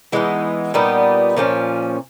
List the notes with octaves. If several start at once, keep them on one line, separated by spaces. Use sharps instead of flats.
E3 G#3 B3 D#4
A#2 G3 B3 D#4
A#2 F3 A3 C#4